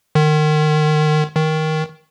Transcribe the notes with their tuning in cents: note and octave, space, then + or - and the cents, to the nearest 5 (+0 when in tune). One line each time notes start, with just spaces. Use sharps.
D#3 -30
D#3 +10